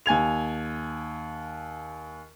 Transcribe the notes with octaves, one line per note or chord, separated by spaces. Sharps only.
D#2 G#5 G#6 F7